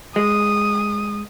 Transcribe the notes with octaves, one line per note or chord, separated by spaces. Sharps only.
G#3 D#6